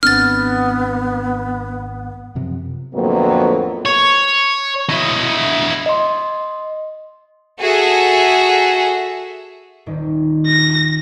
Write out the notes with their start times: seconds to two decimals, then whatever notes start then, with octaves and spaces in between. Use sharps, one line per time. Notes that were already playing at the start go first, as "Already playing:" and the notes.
0.03 G#1 B3 C4 D4 F6 A6
2.35 F#2 C3 F3
2.94 F2 A2 D3 F#3 A#3 B3
3.86 C#5
4.89 E4 D#5
5.86 D#5 C6
7.60 F#4 G#4 A4 E5
9.86 D#1 D#3
10.46 A#6